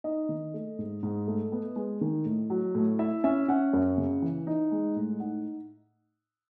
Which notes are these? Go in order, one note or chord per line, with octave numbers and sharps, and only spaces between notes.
D#4 D#5
D#3
A3
G#2
G#2
A3
B3
G#3
D#3
A2
F#3
A2
E4 E5
C#4 E5
C#4 F#5
F#2
C#3
E3
D#4
G#3
A2
D#4 F#5